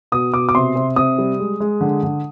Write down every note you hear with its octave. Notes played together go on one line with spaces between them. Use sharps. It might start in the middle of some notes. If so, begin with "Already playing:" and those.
B2 D#6
B2 D6
D6
C3 C6
C3
C3 D#6
G3
G#3
G#3
D3
D3